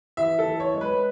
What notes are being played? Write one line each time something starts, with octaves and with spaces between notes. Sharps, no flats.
E3 E5
A4
E3
C#5
G#3
B4